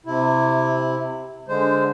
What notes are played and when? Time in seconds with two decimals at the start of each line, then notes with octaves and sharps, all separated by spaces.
0.06 C3 E4
1.48 D3 G#3 C5